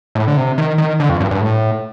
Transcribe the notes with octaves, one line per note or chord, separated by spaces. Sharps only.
A2
D3
C3
D#3
D#3
D3
F2
G2
G2
A2